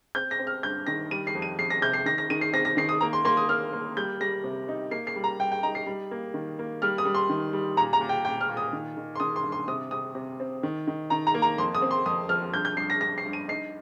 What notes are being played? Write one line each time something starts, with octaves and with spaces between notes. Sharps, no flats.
C4 G6
A#6
C4
F6
G2 G6
D#3 A#6
G3 D#7
C7
F2
D#7
F2 C7
A#6
C3 G6
C7
D#3 A#6
A#6
D#3 D#7
C7
C4 A#6
A#6
D#3 C7
D#6
A#3 A#5
C6
A#3 C6
D#6
A#3 F6
A#3
G3 G6
G3 A#6
C3
D#4
A#3 C7
C7
G3
A#5
G3 G5
G5
D#4 A#5
C7
G3
A#3
D#3
A#3
G3 F6
D#6
G3
C6
D#3
G3
A#2 A#5
A#5
A#2
G5
A#2 G5
F6
A#2
D#6
D#3
D#3
C6
D#3 D#6
C6
G2
C6
C3 D#6
C3 D#6
C3
C4
D#3
D#3
D#3 A#5
A#5
A#3
A#5
F2 C6
D#6
C4
C6
F2 D#6
F3 F6
G2 G6
G6
G2 C7
A#6
G2 A#6
C7
G2
D#7
D#4 C7